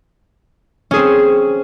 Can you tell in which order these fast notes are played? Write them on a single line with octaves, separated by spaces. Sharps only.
C#4 G#4 C4